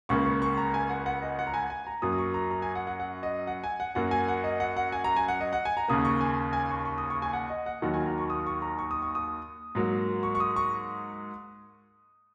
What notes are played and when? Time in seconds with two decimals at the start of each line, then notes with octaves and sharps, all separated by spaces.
0.09 C#2 C#3 A#3 C#6
0.25 C#6
0.42 C#6
0.58 A#5
0.74 G#5
0.89 F#5
1.06 F#5
1.22 D#5
1.39 F#5
1.47 A#5
1.54 G#5
1.70 G#5
1.87 A#5
2.02 F#2 F#3 A#3 D#6
2.12 D#6
2.18 C#6
2.34 A#5
2.51 A#5
2.62 G#5
2.75 F#5
2.87 F#5
3.00 F#5
3.23 D#5
3.47 F#5
3.64 G#5
3.80 F#5
3.95 F#2 F#3 A#3 F#5
4.11 G#5
4.28 F#5
4.44 D#5
4.60 F#5
4.76 F#5
4.92 G#5
5.04 A#5
5.16 G#5
5.28 F#5
5.40 D#5
5.53 F#5
5.65 G#5
5.77 A#5
5.88 D#2 C#3 A#3 D#6
6.05 C#6
6.21 G#5
6.53 G#5
6.69 C#6
6.85 C#6
6.98 D#6
7.10 C#6
7.22 G#5
7.33 F#5
7.50 D#5
7.66 F#5
7.82 D#2 D#3 F#3 F#5
7.94 G#5
8.06 A#5
8.18 C#6
8.30 D#6
8.46 C#6
8.62 A#5
8.79 C#6
8.91 D#6
9.02 C#6
9.15 D#6
9.75 G#2 F#3 A#3
10.23 C#6
10.35 C#6
10.40 D#6
10.56 C#6